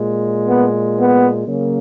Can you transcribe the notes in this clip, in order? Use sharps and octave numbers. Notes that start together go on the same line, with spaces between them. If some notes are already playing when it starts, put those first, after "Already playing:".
Already playing: A#2 G#3
B3
B3
C#3 F#3 A#3